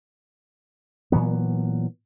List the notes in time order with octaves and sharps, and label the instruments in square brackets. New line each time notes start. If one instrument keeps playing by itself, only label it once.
[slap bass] A#2 E3 F#3 B3